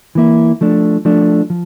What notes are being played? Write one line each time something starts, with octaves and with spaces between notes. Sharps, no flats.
E3 A#3 E4
F3 A3 D4
F3 A3 D4
F3